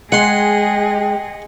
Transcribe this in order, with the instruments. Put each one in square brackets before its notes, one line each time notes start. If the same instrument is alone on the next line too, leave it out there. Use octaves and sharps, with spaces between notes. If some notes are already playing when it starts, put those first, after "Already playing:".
[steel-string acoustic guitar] G#3 [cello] G#4 D#5 [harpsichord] F#5 C6 [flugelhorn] G5